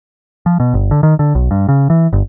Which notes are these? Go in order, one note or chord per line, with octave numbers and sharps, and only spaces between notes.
F3
B2
G1
D3
D#3
D3
B1
G2
C#3
E3
G1